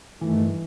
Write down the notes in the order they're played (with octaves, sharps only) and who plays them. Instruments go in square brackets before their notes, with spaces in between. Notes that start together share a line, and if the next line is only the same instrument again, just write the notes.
[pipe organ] G2 D#3 A3 [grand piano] E3